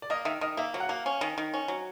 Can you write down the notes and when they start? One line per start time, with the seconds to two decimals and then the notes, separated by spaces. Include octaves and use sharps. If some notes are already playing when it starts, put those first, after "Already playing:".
0.02 D5
0.10 A#3 D#5
0.25 D#3 E5
0.41 D#3 D#5
0.57 A#3 E5
0.74 F#3 F5
0.80 F#5
0.89 A#3 F5
1.06 C#4
1.21 D#3
1.38 D#3
1.54 C#4
1.68 F#3